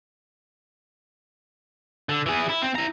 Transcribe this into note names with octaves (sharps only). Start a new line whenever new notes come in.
D3
E3 G#4
E4
C4
E4 A#5